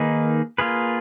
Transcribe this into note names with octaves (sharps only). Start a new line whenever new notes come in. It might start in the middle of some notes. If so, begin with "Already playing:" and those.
Already playing: D#3 A#3 D#4 G#4 B4
A#3 F4 G#4 B4